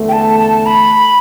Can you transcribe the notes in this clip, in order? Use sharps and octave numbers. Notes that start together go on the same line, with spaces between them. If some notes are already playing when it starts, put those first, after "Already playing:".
Already playing: E2 D3 A3
G5
A5
A5
B5